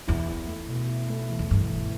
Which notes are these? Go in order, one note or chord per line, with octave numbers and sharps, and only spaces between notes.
E2 E4
E4
A3
B2
E4
A3
E3
E2
G2 E3
E3